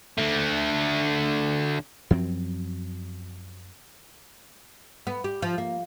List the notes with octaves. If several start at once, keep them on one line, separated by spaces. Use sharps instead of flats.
D3 A3
F#2 F3 F#3 C4
B3
G4
F3
A#3